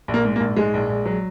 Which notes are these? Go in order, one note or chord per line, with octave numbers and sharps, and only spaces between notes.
A#1
A#3
G#2
A#3
A#1
G#2 G#3
A#1
A#1
F#3